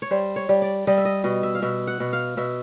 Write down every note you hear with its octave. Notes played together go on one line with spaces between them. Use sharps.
C#5
G3 C5
C#5
G3
D5
G3 D#5
E5
D#5
B2 D#5
E5
F5
B2 E5
F#5
B2
F5
B2 E5